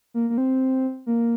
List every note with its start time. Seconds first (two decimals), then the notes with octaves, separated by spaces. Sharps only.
0.14 A#3
0.30 A#3
0.38 C4
1.06 A#3